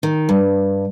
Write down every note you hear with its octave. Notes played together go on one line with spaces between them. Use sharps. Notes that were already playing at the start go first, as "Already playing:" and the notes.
D#3
G2